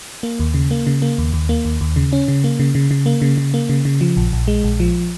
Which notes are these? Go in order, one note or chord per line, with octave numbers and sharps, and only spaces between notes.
A#3
D#2
C#3
A#3
C#3
A#3
D#2
D#2
A#3
D#2
D#2
C#3
C#4
C#3
A#3
C#3
C#3
C#3
A#3
C#3
C#3
A#3
C#3
C#3
F3
A#1
A#1
G#3
A#1
F3